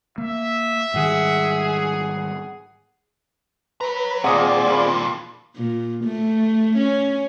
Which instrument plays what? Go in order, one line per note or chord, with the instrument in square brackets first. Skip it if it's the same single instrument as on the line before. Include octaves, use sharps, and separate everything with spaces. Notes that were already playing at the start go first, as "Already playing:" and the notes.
[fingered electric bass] A#3 [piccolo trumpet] E5
[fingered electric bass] G#2 D#3 G3 [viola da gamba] G#4 [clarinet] F#5
[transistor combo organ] B4 [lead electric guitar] C#5 A#5
[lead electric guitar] D#2 A#2 [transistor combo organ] C4 G#4 D5 [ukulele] F4 D#5 F#5
[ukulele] F4 B5
[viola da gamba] A#2
A3
C#4